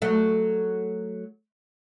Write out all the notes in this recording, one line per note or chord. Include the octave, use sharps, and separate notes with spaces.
F#3 A3